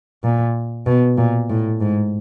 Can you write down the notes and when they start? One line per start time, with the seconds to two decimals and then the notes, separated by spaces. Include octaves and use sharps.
0.24 A#2
0.86 B2
1.18 A#2
1.50 A2
1.81 G#2